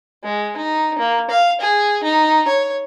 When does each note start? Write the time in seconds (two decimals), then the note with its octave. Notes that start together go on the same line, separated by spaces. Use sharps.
0.24 G#3
0.57 D#4
0.99 A#3
1.30 F5
1.61 G#4
2.03 D#4
2.48 C#5